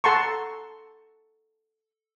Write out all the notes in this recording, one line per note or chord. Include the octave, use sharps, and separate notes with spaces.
A4 F#5 A5 A#5 C6 C#6